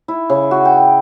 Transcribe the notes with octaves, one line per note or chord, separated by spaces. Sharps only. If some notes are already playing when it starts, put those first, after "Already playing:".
E4
C#3
F#4
G5